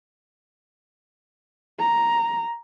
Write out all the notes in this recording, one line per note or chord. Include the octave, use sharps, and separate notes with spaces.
A#5